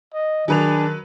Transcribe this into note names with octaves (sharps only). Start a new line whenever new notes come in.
D#5
D#3 F#3 D4 G#4 B4 F7